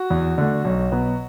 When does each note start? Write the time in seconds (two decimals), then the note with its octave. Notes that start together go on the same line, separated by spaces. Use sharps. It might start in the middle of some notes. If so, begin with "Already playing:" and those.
Already playing: F#4
0.10 E2
0.38 D3 A3
0.64 B1
0.92 B2 F#3 B3